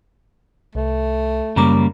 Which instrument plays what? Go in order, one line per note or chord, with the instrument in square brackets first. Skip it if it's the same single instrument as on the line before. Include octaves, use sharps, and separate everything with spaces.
[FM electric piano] C2 [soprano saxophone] A3
[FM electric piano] F#2 A#5 D6 [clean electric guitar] C#3 G3 A#3